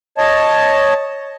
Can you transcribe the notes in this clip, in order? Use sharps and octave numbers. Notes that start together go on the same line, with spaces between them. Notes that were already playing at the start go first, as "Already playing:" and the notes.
C#5 D#5 A5